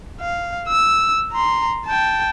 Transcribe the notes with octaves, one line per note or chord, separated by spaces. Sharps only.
F5
E6
A#5 C6
G5 A5